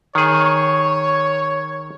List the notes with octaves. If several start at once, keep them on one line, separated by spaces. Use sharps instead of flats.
D#3 G#4 C#5